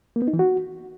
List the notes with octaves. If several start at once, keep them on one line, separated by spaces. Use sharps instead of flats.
A#3
B3
D#4
E3
F#4